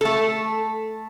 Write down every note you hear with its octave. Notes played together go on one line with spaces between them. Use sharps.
A3 A4